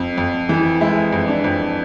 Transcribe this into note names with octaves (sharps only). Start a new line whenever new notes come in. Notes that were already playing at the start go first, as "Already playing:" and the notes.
Already playing: F2
F2
E3
G#3 E4
F2
D4
F2